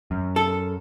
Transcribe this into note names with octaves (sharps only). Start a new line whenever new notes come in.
F#2
A4